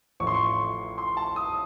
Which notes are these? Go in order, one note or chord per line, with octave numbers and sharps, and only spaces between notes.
A1 A2 F3 C#6
C6
C#6
C6
A5
D#6